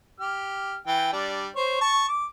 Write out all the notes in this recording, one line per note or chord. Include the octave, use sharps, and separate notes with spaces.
G4 F6
E3 G5
G3 D4
C5 C#5
A5 C#6
D6